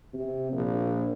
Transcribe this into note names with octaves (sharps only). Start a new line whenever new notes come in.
C3
A#1